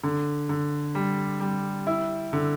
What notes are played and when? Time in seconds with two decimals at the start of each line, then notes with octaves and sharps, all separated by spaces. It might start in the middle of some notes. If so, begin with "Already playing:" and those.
0.03 D3
0.49 D3
0.95 G3
1.41 G3
1.87 E4
2.33 D3